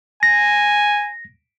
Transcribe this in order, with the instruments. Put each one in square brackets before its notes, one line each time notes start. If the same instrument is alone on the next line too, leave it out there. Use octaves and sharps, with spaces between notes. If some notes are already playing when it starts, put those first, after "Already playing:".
[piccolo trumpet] G#5 [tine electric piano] A#6